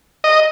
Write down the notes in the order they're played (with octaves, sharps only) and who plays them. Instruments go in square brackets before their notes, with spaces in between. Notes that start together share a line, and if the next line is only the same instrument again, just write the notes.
[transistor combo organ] D#5